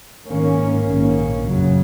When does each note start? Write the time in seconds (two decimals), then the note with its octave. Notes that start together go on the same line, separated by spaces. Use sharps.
0.27 G#1 G#2 D#3 A#3 C#4
0.85 A#1 G#2 D#3 A#3 C#4
1.43 F#2 C#3 F#3